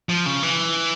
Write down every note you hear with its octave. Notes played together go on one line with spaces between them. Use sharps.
F3
C#3
E3